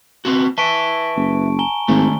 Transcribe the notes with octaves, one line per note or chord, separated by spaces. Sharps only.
B3 C4 F#4
B4 E5 A5 C#6 D7
F#1
G#5 A#5 G7
G#1 D#3 A3